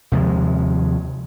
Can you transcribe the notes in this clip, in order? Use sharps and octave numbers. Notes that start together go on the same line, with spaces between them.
D#2 C3 F3 G#3